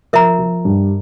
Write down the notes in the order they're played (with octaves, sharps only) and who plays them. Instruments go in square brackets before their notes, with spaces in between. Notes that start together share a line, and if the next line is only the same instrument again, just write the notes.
[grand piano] F3 [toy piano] A#4 E5 A#5
[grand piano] F3
G2 G3